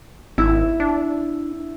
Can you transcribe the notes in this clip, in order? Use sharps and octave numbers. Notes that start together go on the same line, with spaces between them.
G#1 E4
D4